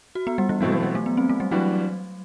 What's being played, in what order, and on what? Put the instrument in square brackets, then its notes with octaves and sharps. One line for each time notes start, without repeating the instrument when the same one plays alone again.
[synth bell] F#4
B3
G3
E3
[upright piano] B2 A3 C4 E4 [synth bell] F#3
[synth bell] F#3
G3
A3
B3
C4
A3
G3
[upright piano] E3 G3 D4 F#4 [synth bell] F#3